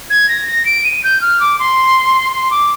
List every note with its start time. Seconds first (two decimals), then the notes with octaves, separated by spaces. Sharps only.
0.10 G#6
0.28 A#6
0.47 A#6
0.65 D7
0.84 D#7
1.03 G6
1.21 F6
1.40 D6
1.59 C6
2.31 C6
2.50 D6